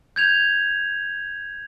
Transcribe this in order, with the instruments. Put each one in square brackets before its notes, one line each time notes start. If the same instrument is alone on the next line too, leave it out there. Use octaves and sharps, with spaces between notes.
[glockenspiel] G6 G#6 F7